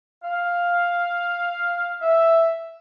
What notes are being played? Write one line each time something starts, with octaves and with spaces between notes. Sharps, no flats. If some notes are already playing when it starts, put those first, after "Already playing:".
F5
E5